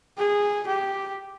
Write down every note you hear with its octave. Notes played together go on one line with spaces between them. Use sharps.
G#4
G4